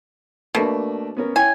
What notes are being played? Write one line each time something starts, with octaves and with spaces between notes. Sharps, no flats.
B2 A3 A#3 D4
B3 C#4 A#4
E4 C#5 G5 G#5